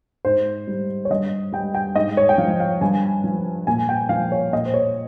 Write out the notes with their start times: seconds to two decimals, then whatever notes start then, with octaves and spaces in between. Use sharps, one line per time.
0.25 G#2 C5
0.67 G3
1.05 C#5
1.10 G2 D#5
1.52 G3 G5
1.75 G5
1.96 G#2 D#5
2.17 C#5
2.29 G5
2.38 F3 F5
2.60 F5
2.81 G2 G#5
3.24 F3
3.67 A#2 G#5
3.89 G5
4.09 F3 F5
4.32 C#5
4.53 A#2 D#5
4.66 C5
4.74 C#5